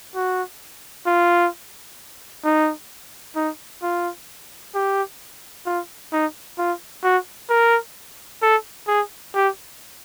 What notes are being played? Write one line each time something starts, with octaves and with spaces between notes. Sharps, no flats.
F#4
F4
D#4
D#4
F4
G4
F4
D#4
F4
F#4
A#4
A4
G#4
G4